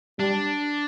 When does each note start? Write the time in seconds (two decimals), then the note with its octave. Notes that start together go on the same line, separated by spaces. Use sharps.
0.19 G3 D4